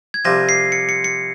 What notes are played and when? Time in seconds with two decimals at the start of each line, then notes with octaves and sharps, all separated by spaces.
0.14 G#6
0.25 C2 C3 F3 A#6
0.49 C7
0.72 C#7
0.89 C#7
1.04 C#7